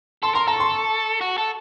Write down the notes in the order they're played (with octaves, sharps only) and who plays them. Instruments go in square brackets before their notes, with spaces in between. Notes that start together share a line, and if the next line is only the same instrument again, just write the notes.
[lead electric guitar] A4 [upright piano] C6
[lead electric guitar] A#4 [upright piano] C6
[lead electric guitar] A4 [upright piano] A#5
[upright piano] C#6
C6
C#6
[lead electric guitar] F#4
A4